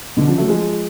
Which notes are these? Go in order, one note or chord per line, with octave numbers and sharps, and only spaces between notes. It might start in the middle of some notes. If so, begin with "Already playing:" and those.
B2 D3
C#3 F3
F#3 A3
F3 G#3